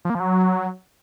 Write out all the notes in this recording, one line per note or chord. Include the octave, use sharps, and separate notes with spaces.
F3
A#3
F3
F#3